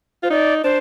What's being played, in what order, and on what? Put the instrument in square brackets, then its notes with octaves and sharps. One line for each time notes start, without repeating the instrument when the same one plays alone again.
[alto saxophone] F4 [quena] C5
[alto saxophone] D#4 [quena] D5
[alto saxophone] D4 [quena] C5